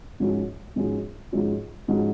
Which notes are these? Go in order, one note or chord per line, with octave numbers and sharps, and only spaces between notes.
G#2 F3 G#3 C#4 F#4
G#2 F3 G#3 C#4 F#4
G#2 F3 G#3 C#4 F#4
G#2 F3 G#3 C#4 F#4